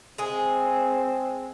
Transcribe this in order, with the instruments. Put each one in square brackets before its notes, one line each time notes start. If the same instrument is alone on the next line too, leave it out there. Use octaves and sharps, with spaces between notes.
[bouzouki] G#3 G#4 [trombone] C4